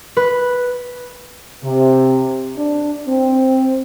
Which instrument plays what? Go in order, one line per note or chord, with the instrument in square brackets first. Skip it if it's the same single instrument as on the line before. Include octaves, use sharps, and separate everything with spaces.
[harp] B4
[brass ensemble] C3
D4
C4